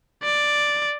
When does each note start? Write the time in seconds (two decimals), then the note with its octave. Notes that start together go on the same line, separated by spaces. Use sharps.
0.23 D5